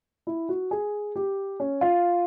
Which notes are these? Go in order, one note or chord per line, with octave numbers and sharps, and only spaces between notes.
E4
F#4
G#4
G4
C#4
F4